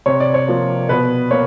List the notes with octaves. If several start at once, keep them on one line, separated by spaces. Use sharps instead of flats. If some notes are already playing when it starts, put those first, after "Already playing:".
C3 C#5
D5
C#5
F3 A#3
B2 B4
A#3 C#5